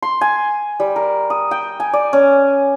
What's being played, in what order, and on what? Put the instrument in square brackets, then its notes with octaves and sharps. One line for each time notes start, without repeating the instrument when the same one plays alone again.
[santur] C6
G#5
G3
A#4
D#6
G5
G#5
D5
C#4